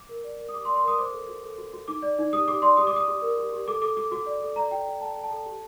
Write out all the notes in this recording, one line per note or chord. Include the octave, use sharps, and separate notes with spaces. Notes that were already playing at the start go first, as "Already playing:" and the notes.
Already playing: D6
A#4
D5
A#4
D#6
G4 D6
C6
D5
C6
A#4 D#6
C5 D6
A4
F#4
A4
F#4
F#4
D#4 D6
D5
D#4
G4 D#6
G4 D6
D5 C6
G4 D#6
D6
G4 D#6
G4
A#4
G4
G4
A4 D6
A4 D6
F#4 D6
F#4 D6
D5
A4
D5 A#5
F#4 G5
F#4
A4 A5
A4
A5
A4
G4